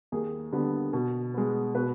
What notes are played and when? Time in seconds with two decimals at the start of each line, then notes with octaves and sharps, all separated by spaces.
0.12 D#2 G#4
0.53 D3 G3 B3
0.93 B2
1.34 G#3 B3
1.75 B2 B4